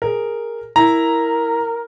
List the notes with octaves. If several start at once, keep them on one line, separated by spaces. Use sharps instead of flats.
G#4 A#4
E4 A#4 A#5